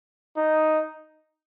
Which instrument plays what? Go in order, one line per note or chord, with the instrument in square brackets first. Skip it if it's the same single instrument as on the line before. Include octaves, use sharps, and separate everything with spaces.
[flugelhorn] D#4